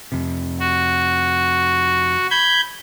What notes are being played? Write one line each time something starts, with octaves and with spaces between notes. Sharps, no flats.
F2 C3
F#4
B5 G6 G#6